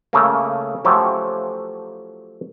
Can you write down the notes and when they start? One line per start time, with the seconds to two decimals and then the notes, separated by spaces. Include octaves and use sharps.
0.13 C#3 A3 A#3
0.85 F3 F#3 A3 C#4 G4